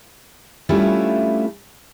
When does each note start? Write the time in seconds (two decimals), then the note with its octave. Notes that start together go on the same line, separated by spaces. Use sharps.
0.69 G3 A3 C#4 D4 E4 F4